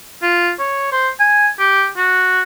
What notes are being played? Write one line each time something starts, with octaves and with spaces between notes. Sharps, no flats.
F4
C#5
C5
G#5
G4
F#4